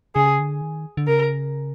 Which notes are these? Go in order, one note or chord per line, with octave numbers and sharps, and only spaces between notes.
C#3 G#4
D3
D#3
D3
C#3 A#4